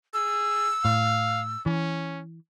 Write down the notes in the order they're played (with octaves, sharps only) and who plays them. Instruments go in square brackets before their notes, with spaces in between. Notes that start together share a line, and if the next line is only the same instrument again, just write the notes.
[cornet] G#4 [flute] E6
[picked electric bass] A2 [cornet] F5
[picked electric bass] E3 [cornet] C#4